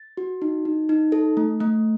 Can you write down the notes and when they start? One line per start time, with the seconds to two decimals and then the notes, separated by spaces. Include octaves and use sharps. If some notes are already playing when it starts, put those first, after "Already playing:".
Already playing: A6
0.17 F#4
0.42 D#4
0.65 D#4
0.89 D#4
1.12 A4
1.37 A3
1.60 A3